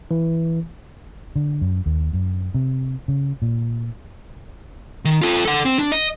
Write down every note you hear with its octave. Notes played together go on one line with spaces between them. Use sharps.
E3
D3
F#2
D#2
F#2
C3
C#3
A#2
D#3
F4 A4
A4 F#5
C4
D4
D#5